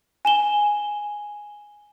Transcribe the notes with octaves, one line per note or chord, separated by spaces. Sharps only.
G#5 E7 G7